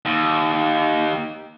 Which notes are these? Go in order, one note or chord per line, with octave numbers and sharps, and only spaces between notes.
D#2